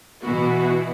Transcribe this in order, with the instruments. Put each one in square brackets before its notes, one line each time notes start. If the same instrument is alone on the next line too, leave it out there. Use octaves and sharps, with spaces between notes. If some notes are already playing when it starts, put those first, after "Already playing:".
[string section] B2 E3 B3 [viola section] E4 F#4